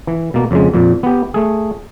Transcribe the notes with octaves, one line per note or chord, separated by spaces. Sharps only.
E3
B2 A#3
F2 C#3 G#3
F2 A#2
B3 G4
A3 G#4